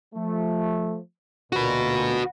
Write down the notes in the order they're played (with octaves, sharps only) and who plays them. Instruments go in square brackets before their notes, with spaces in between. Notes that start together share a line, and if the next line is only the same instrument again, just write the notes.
[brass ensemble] F3 A3
[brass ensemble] D2 A#2 [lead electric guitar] F#4 B4